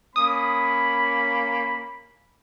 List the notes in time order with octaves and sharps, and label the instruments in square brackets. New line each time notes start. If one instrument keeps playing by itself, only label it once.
[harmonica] A#3 C#4 [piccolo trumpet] B5 [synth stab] D#6